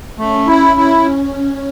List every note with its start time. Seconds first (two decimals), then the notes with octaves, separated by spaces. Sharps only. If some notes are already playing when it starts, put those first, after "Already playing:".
0.18 A3 C#4
0.47 E4
0.77 E4